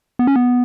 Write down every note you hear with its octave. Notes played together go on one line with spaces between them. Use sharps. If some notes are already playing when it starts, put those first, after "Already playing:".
B3
C#4
B3